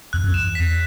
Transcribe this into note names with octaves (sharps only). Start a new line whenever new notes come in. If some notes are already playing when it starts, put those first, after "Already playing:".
E2 F#6
F#2
E2 E7
B6